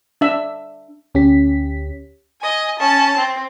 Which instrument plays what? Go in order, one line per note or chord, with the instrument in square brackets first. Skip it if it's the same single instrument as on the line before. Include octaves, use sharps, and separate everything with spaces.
[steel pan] D4 E5
[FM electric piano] D2 C#4 G4 B6
[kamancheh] D#5 G#5
C#4 A5
C4